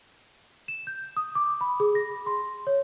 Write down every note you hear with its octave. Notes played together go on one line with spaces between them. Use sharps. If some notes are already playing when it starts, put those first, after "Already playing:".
E7
G6
D#6
D6
B5
G#4
A#6
C6
C#5